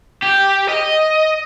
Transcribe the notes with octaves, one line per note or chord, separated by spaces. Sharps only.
G4
D#5